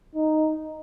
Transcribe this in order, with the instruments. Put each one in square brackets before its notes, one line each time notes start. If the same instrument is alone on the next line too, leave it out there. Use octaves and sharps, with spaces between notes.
[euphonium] D#4